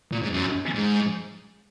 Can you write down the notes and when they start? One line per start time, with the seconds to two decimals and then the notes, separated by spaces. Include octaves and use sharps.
0.12 A#2
0.23 G#2
0.33 F#2
0.74 G#2